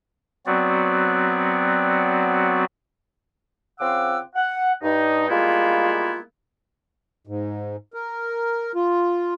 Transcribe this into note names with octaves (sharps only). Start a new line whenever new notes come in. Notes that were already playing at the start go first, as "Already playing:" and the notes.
F#3 B3 C4 F#4 D5
C#3 C4 F4 F#5 D6 E6
F#5
G2 D#4
G3 G#3 A#3 B3 E4 F4
G#2
A#4
F4